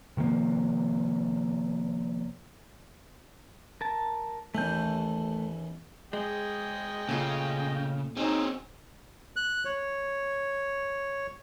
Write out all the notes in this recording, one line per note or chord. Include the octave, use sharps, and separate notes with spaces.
C3 D#3 F3 A#3
A#4 A5
A1 D#2 E3 A3 G6
G#3 G#4 D#5 G5
A#2 C#3 A3 F4
F#3 C4 C#4 D#4 G#4
F#6
C#5